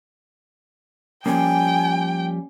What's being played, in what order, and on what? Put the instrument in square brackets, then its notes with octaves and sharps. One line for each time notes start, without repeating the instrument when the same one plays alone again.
[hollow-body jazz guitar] F3 G3 A#3 [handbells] C#4 [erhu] G5 [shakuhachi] G#5